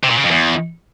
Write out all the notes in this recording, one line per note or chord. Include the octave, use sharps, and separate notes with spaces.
C3
A#2
C#3
F2
E2